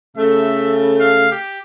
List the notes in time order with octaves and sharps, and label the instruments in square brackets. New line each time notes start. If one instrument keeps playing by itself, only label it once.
[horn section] C#3 A3 [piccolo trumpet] E5
[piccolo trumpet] F5
G4